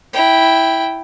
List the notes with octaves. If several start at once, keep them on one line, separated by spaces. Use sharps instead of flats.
E4 G5